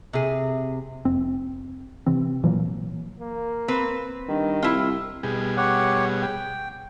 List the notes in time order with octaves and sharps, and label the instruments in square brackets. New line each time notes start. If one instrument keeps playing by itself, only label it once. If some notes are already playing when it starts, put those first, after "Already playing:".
[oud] C3 G#4
[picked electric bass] F1 C4
C3 E3 C4
A#2 E3 F#3 A#3
[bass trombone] A#3
[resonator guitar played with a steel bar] C4 B4
[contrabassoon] G2 [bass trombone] D#3
[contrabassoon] C2 [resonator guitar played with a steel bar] E4 F4
[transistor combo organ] B2 G3 G#4
[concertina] G4 C#5 F#5
G5